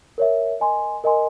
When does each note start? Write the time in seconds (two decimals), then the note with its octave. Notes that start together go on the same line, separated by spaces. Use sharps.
0.18 A#4 C#5 E5
0.60 A#4 D#5 G#5 C6
1.04 A#4 D#5 G#5 C6